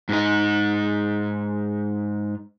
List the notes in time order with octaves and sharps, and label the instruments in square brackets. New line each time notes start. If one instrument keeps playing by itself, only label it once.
[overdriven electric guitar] G#2 D#4